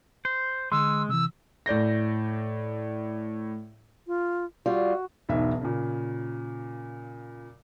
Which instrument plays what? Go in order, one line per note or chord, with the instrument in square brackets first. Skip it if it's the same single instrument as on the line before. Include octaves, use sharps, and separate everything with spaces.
[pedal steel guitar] C5
[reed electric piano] D3 C6 [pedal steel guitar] G#3 [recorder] E6
[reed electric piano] C3 E3 [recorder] E6
[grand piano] A2 D5 G6 A#6
[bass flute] F4
[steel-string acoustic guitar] G3 F4 [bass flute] F#4
[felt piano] E1 B1 G#2 E5
A#2 C#3